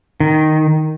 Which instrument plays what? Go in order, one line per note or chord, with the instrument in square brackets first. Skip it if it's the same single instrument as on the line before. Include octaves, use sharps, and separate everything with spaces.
[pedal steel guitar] D#3